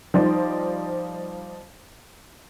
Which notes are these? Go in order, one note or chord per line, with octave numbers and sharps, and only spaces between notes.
F3 G3 D#4 C5 D5